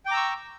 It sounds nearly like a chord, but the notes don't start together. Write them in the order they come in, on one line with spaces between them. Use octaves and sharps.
G5 D6 A#5 E6 C#6